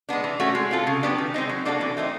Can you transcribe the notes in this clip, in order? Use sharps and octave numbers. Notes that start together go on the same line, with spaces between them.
G#3 B3 D4
E3
A3 C#4 F#4
G#3
C4 F4 A4
C#3
F#3 B3 D4 G4
D#3
G#3 C4 D#4
F#3
A#3 D4 F#4 A4
E3
A3 C4 D#4